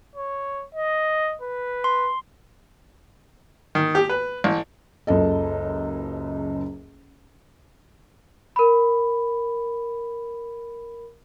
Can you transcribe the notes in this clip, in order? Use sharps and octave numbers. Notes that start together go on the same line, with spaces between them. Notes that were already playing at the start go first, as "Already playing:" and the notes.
C#5
D#5
B4
C6
D#3
G4
B4
A1
F#1 C#2 F#2 A4 D#5
A#4 B5